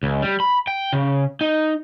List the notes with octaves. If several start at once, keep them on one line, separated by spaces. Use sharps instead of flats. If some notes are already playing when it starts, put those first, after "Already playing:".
C#2
G3
B5
G5
C#3
D#4